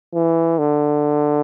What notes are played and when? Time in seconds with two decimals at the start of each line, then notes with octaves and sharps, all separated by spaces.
0.14 E3
0.58 D3